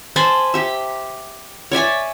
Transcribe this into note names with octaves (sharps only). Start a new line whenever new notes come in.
C5 G#5 A5 B5
G4 E5
C#5 D5 E5 G#5